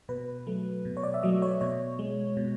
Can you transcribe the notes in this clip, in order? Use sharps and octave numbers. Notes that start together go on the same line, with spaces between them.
B2 B4
F#3 A3
B2
C#5
D5
E5
F#3 A3 D#5
C#5
B2 C#5
G#3
B2